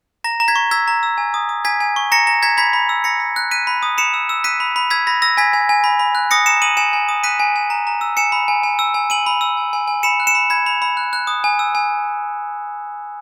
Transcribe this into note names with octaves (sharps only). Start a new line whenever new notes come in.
A#5 A#6
A#5
G#6 B6
C#6
E6 G#6 B6
A#5
E6
G#5
D#6
D#6
G#5 G#6 B6
G#5
C#6
A#5 A#6 C#7
A#5 A#6
A#5 G#6 B6
B5 G#6 B6
B5
E6
B5 A#6 C#7
B5
F#6
F#6 B6 D#7
B5
D#6
B5 C#7 E7
E6
E6
F#6 B6 D#7
B5
B5
E6 G#6 B6
B5 A#6
E6 A#6
G#5 G#6 B6
G#5
G#5
B5
B5
F#6
D#6 A#6 C#7
A#5 C#7 E7
D#6 D#7 F#7
G#5 C#7 E7
G#5
D#6
F#6 B6 D#7
G#5
G#5
A#5
A#5
E6
G#5 C#7 E7
B5
G#5
G#5
E6
G#5
G#5 D#7 F#7
B5
E6
G#5
G#5
G#5
B5 C#7 E7
F#6
C#7 E7
B5
B5 G#6
B5
B5
F#6
F#6
D#6
G#5
E6
G#5